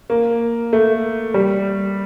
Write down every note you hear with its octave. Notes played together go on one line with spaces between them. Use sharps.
A#3
A3
G3